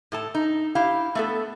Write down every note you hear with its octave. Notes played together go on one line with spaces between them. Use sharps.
A2 A4 A5
D#4
E4 G4 F5
A3 B3 A4